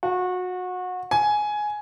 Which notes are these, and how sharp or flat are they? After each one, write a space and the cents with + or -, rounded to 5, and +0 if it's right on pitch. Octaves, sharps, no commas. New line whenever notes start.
F#4 -25
G#5 +10